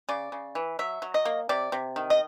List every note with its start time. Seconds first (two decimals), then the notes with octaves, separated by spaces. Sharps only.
0.09 C#3 D5
0.32 C#3
0.55 E3
0.79 F#3 E5
1.02 F#3
1.14 D#5
1.25 A#3
1.49 C3 D5
1.72 C3
1.96 D#3
2.10 D#5